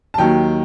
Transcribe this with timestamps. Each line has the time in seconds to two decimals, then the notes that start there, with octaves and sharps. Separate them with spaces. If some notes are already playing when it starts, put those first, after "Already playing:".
0.14 A5
0.18 D#2 D#3 F#3 G5